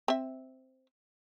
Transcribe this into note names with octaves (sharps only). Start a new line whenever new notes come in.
C4 E5